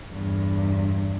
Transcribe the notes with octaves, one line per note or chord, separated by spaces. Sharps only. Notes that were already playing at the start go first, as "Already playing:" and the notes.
E2 G2